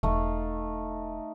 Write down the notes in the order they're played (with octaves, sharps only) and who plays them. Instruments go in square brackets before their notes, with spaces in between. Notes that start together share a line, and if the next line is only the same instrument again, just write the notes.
[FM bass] E1 [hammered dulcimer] A3 D#4 F5